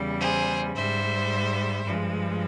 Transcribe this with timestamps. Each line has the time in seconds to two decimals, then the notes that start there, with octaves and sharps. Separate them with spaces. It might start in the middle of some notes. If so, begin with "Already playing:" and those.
Already playing: E2 C#3 G3
0.19 G#4 C5
0.74 G#2 G3 C5 E5
1.83 G2 F3 G#3